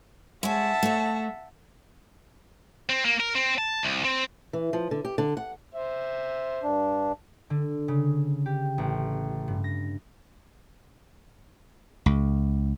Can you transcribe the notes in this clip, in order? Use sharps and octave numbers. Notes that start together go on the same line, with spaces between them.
G#3 C#5 E5 F#5 A5
A3 C#5
C4
A#3
A#4
C4
A5
C2
C4
E3
F3
D3
G4
D3
F#5
C5 E5
G2 D4
D3
C#3
G4
A1
G2
A#6
C#2